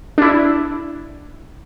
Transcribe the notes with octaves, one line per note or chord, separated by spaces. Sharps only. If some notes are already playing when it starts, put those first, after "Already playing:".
D4 E4